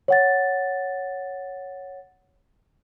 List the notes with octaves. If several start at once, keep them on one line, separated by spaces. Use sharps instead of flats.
C#5 F#5 A6